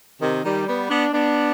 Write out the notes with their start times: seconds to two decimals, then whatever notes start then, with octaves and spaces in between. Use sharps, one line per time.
0.21 C3 D#3
0.44 D#3 G3
0.67 G3 B3
0.89 B3 D4
1.12 B3 D4